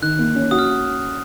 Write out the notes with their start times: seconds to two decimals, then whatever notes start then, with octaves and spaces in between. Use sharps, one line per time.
0.02 D#3 F#6
0.19 A#3
0.35 C#4
0.51 F#4 D#6
0.59 F6